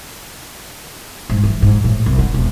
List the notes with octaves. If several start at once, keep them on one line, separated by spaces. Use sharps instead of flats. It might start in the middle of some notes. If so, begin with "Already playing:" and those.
G#2
E3
G#2
A2
C2
D3
E1